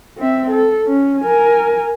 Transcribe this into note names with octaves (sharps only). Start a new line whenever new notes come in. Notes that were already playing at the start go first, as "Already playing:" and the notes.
C4 E5
A4
C#4
A#4 G#5